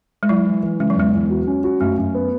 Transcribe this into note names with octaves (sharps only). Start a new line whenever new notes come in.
G#3
F#3 E4
E3
E3
C#3 G#3
F#3
E2 G#3
E2
F#4
C#4
F#4
F#2 A3
F#2
B3